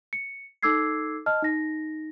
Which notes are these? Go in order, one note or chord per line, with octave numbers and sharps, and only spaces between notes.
C#7
D#4 A4 D6 E6 G#6 C7
D#5 A5 F6
D#4 A#6